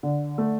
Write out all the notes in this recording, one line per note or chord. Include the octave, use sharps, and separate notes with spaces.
D3
A3